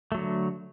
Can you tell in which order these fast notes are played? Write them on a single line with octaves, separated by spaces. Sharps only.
A3 F#3 D3